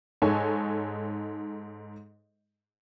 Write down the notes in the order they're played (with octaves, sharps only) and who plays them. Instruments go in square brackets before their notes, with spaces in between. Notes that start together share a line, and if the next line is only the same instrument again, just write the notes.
[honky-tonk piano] G#2 D#4 A4 C#5 G#5